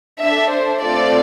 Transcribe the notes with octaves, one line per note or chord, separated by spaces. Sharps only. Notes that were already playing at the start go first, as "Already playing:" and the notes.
D4 A4 E5
C5
A3 C4 F4 A4 D5